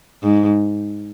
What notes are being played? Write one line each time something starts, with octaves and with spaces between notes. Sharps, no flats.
G#2